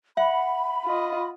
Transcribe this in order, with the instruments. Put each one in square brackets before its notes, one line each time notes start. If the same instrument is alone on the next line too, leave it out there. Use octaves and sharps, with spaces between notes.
[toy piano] E5 [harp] F#5 [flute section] B5
[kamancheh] F4 D#5